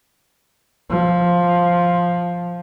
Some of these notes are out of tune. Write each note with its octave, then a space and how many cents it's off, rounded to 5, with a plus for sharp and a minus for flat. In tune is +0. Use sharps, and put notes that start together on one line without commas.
F3 +5